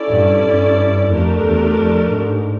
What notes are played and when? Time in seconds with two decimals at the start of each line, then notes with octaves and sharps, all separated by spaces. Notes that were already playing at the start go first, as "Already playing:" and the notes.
Already playing: C#4 E4 A4 D5
0.09 G2
0.43 G2
1.10 F2 A3 D4 G4 A#4
1.44 E2
1.77 F2
2.11 G#2